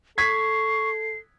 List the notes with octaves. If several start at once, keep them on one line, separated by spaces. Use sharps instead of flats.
A4 C#6 G#6 B6 C7